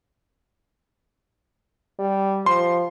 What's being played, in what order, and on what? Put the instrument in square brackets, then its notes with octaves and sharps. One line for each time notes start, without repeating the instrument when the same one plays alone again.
[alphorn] G3
[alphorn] F3 [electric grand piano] C6